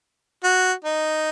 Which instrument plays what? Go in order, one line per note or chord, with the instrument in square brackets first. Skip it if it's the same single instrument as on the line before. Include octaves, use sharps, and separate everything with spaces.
[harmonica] F#4
D#4